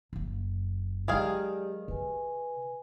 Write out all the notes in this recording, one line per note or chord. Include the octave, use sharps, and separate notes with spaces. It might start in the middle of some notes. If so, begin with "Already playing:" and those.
F#1 F#2
D#3 F#3 G#3 G4 G#4 A#4 D5 F5
C3 B4 G#5